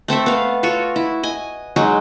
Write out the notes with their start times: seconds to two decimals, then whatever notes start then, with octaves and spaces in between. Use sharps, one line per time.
0.08 A3 C4 A4 E5
0.26 B3 F5
0.63 F4 F#4 A4 C#5
0.96 E4
1.23 D#5 G#5
1.76 F#3 G#3 D#4